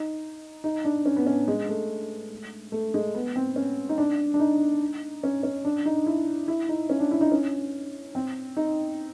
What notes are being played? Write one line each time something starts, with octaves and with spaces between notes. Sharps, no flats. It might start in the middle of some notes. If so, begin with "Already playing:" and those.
Already playing: D#4
D#4
D4
C#4
B3
C#4
G#3
A3
A3
G#3
B3
C4
C#4
D#4
D4
D4
D#4
C#4
C#4
D4
D#4
E4
E4
D#4
C#4
D4
E4
D#4
C#4
C4
D#4